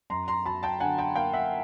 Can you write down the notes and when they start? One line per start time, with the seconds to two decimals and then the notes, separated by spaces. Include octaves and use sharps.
0.10 F#2 A#5 C6
0.28 A#5 C6
0.46 F#3 A5 B5
0.63 G5 A5
0.80 D3 F#5 G#5
0.98 G5 A5
1.16 A#3 F5 G5
1.33 E5 F#5